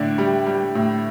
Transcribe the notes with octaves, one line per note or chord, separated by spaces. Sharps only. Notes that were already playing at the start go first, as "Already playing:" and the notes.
Already playing: A2 D3 D4
G3
G3
A2